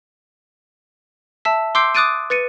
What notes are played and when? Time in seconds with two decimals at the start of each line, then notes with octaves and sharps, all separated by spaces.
1.45 E5 A5 E6 B6
1.75 C6 D6 E6 G6 C7 D7
1.95 D6 D#6 F#6 A6 D7 D#7
2.30 B4 A6 C#7 D#7